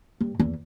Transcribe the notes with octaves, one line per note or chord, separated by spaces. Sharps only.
G2
E2